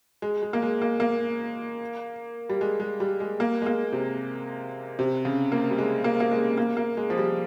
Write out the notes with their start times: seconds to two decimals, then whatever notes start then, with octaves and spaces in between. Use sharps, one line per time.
0.22 G#3
0.43 G#3
0.53 A#3
0.62 G#3
0.82 A#3
1.00 A#3
2.49 G3
2.61 G#3
2.80 G#3
3.00 G3
3.20 G#3
3.40 A#3
3.62 G#3
3.66 A#3
3.92 C3
4.99 C3
5.25 C#3
5.52 A#3
5.71 G3
5.78 G#3
6.04 A#3
6.20 A#3
6.31 G#3
6.58 A#3
6.77 A#3
6.97 G#3
7.10 F3
7.18 G3